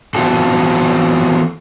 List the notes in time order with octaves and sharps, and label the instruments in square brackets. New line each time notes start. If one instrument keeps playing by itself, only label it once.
[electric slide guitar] E3 B3 C4 F4 F#4 A4